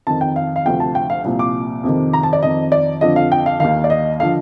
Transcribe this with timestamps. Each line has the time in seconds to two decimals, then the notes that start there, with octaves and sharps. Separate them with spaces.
0.07 F2 D#3 A5
0.21 G5
0.36 F5
0.56 F5
0.65 D2 C3 F3 G5
0.80 A5
0.95 G5
1.10 F5
1.24 C2 A#2 F3
1.39 D6
1.84 F2 C3 D#3
2.13 A#5
2.23 A5
2.33 D5
2.43 F2 D#3 D#5
2.72 D5
3.01 F2 D3 F3 D#5
3.16 F5
3.32 G5
3.46 F5
3.60 D#2 D#3 F5
3.84 D5
3.90 D#5
4.20 D3 F3 F5